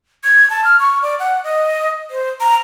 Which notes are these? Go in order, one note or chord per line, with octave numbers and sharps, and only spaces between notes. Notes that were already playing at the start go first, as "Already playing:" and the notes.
G#6
A5
F6
C#6
D5
F#5
D#5
C5
A#5